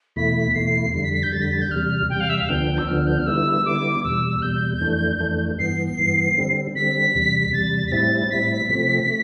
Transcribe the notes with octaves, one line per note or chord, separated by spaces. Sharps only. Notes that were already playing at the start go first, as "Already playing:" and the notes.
E2 B2 A3 E4 B6
E2 B2 A3 E4 C7
F2 D3 G3 C7
B6
B6
G6
F2 D3 G3 A6
B6
A6
G6
E2 C3 G3 F6
E2 C3 G3 G5
F5
E5
F5
D2 D3 F3 B3 D4 G5
E6
D2 D3 F3 B3 D4 F6
G6
F6
D3 G3 B3 E4 E6
D3 G3 B3 E4 D6
E2 B2 G3 E6
E2 B2 G3 G6
F2 E3 A3 D4
F2 E3 A3 D4
G2 E3 B3 C7
G2 E3 B3
D3 G3 C4
D3 G3 C4 B6
E2 C3 G3
E2 C3 G3 A6
B6
A2 G3 C4 E4 A6
A2 G3 C4 E4 B6
C3 F3 A3 C4
A3